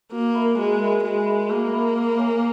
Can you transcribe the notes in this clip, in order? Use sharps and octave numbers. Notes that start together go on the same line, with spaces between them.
A#3 F#4
A#4 E5 B5
G#3 F#4
A#4 E5 B5
G#3 F#4
A#4 E5 B5
A#3 F#4
A#4 E5 B5
A#4
C#5 G#5